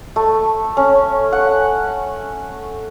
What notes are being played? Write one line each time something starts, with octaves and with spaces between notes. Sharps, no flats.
A3
C#4
F#5